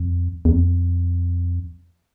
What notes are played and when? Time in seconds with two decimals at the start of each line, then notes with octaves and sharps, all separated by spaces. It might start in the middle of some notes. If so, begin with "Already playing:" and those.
Already playing: F2
0.45 E2
0.51 F2